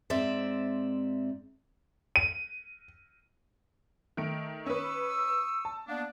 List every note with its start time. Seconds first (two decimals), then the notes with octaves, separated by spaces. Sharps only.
0.10 G#2 C4 D5 E5
2.16 D#7
4.17 D#3 A3 D7
4.66 C#4 B4 C#6 D#6 E6
5.65 A5
5.88 A#3 B3 D4